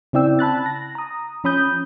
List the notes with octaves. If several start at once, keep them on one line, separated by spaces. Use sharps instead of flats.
C#3 C4 E4 D5 G5 E6
A5 B5 F#6 A6
A#6
A#5 D#6
F3 C#4 B5 D#6 G6